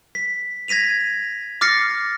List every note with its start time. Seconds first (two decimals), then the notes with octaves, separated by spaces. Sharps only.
0.15 B6
0.68 G#6 A#6 B6 D#7 F7
1.61 D6 F6 A6 A#6 C7 C#7